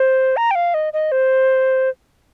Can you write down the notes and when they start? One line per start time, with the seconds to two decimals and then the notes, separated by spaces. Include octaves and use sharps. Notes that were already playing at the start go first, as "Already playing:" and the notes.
Already playing: C5
0.37 A#5
0.51 G5
0.55 F5
0.74 D#5
0.93 D#5
1.12 C5